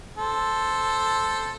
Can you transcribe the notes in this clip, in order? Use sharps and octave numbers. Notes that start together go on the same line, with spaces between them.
A4 C5